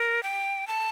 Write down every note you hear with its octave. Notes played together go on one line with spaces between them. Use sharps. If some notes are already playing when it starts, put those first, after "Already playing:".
Already playing: A#4
G5
A5